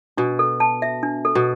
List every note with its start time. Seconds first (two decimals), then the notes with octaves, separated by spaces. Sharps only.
0.17 B2 D4
0.39 A4
0.60 A5
0.82 E5
1.03 D4
1.25 A4
1.35 B2